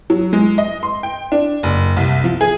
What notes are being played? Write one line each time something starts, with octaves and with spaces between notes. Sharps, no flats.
F#3
G#3
D#5
C6
G5
D4
F#1
C2
F3
G#4